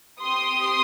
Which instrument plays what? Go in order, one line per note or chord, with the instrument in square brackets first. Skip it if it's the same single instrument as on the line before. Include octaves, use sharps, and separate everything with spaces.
[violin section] C4 G4 C6 D#6